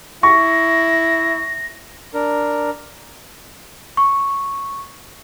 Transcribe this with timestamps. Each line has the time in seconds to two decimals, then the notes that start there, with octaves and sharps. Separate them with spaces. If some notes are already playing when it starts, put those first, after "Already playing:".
0.23 E4 C#6 A#6
2.14 D4 A#4
3.97 C#6